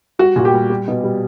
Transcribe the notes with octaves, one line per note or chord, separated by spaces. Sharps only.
G3 F#4
A#2 F#4
G4
G3
G3
B2
G3